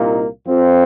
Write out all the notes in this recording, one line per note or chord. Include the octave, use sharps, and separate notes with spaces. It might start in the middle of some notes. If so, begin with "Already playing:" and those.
Already playing: C2 A#2 A#3 D#4
F2 F3 C4